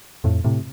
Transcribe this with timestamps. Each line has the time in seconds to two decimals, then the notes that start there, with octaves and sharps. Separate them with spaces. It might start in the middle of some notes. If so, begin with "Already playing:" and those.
0.24 F2 A2
0.44 A2 C3